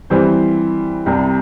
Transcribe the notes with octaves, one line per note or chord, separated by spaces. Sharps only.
E3 G3 C4 G4 C5
C2 C3 G3